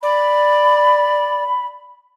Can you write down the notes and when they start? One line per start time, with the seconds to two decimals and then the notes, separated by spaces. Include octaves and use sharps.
0.03 D5 B5